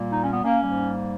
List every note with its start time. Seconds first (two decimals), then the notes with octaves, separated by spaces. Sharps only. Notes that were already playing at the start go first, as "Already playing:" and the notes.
Already playing: A#2 G3 A#3
0.12 D#4
0.22 C#4
0.32 B3
0.43 A#3 C#4
0.62 G#2 G3 A#3